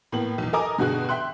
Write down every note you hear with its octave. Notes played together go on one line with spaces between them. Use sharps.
A2 A#3 B3 F#7
B1 E2
A4 A#4 D#5 G#5 A#5 D6
G2 B2 D3 F#4 G#4 F#6
E5 G5 C6 F#6